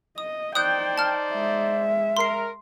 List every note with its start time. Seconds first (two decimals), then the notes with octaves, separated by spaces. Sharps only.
0.18 D#5 D#6
0.55 D#4 C5 D5 G5 D#6 F#6 G6
0.98 A5 F6
1.33 G#3 E5
2.17 A#4 C6 C7